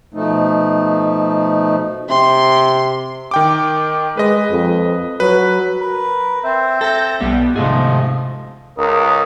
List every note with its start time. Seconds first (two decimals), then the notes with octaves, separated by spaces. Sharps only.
0.14 B2 F3 A3 D#4
2.09 C3 C6
3.31 D#3 G5 D6
4.17 G#3 B4 D#5
4.52 F2
5.20 F#3 B4
5.80 A#4 B4
6.44 C4 C5 E5
6.81 A4 E5 G6 A#6
7.21 B1 G3 B3
7.56 G#2 C3 F3 A3 G#4 D#5
8.78 C#2 A#4 D#6